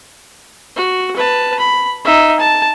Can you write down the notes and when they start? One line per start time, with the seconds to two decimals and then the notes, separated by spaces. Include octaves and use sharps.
0.76 F#4
1.16 B4 A5
1.59 B5
2.04 D#4 E5
2.39 A5